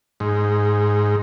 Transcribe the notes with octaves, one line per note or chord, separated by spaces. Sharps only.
G#2